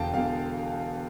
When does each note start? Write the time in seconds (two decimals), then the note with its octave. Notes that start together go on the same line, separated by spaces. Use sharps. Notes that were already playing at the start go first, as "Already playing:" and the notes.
Already playing: E1 E2 D3 F5 G5 A5
0.13 E1 E2 D3 F5